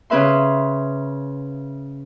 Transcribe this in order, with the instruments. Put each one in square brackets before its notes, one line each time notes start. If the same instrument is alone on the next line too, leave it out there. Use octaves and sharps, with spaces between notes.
[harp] C#3 C#4 B4 E5 C6